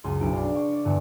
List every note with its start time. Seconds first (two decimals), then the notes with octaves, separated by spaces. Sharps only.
0.04 C#2 F#2 G#4 C6
0.21 B1 D4 E4 D7
0.33 D5 F5 C6
0.54 F5 G5 C#6
0.73 D5
0.85 E2 G2 D3